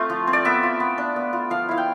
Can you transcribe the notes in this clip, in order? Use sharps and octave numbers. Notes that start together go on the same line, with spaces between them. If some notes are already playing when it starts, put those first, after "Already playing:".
Already playing: A3 C4 F4
F3
C4
D5
B3 E5
F4
B3
D4
B3
F4
F3 F5
E4 F5
G5